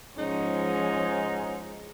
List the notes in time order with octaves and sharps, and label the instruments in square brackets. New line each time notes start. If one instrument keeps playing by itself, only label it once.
[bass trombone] G#2 [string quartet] F3 G#3 C#4 [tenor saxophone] D#4